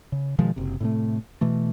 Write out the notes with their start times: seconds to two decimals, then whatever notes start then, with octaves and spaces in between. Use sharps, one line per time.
0.12 C#3
0.38 B2 D#3 F3 G#3
0.56 F#1 C3
0.80 A2 C3 A3
1.41 B2 E3 A3